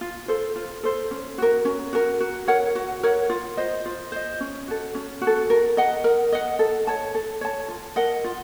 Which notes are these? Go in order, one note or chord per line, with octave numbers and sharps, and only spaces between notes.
F4
A4 C5
F4
A4 C5
C#4
F#4 A#4
C#4
F#4 A#4
F#4
A#4 C#5 F#5
F#4
A#4 C#5 F#5
F4
C5 D#5
F4
C5 D#5
C#4
F#4 A4
C#4
F#4
A4
A#4
D#5 F#5
A#4
D#5 F#5
A4
C#5 A5
A4
C#5 A5
F4
A#4 D#5 F#5
F4